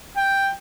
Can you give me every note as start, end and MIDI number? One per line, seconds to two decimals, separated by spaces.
0.17 0.49 79